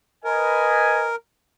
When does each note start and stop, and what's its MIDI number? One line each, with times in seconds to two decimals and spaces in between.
0.24 1.16 70
0.24 1.11 71
0.24 1.11 75
0.24 1.11 80